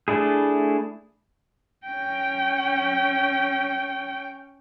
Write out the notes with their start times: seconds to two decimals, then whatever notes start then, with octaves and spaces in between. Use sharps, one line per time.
0.08 A3 D4 E4 G#4
1.87 C#4 G5